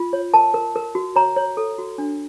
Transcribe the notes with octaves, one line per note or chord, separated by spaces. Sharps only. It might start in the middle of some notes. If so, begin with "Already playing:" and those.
Already playing: F4
C#5
A#4 A5
A#4
A#4
F#4
C#5 A#5
C#5
A4
F#4
D4